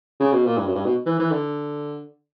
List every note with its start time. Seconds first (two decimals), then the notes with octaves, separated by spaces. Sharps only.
0.20 C#3
0.32 B2
0.45 A#2
0.57 G2
0.66 F#2
0.75 G2
0.85 B2
1.06 E3
1.19 E3
1.31 D3